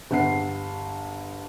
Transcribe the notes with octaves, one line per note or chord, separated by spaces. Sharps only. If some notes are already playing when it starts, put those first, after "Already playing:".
G1 F#5 C7